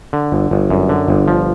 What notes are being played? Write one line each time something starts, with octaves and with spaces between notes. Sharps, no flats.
D3
G1
G1
F#2
D3
G1
F3